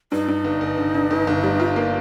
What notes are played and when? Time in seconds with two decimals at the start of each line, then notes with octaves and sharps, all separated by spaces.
0.12 G2 D#4
0.28 G2
0.45 G1
0.61 G1
0.78 D3
0.94 D3
1.11 G1
1.27 G1
1.44 G3
1.60 F4
1.76 A#3